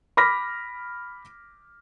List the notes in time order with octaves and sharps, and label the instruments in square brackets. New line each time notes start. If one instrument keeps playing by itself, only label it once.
[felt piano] B5 D6 F6 A#6 B6